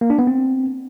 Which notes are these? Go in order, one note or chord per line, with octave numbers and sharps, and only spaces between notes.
A#3
D4
B3
C4